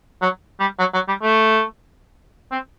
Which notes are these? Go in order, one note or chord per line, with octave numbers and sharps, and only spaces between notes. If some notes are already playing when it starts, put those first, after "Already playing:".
F#3
G3
F#3
F#3
G3
A3
C4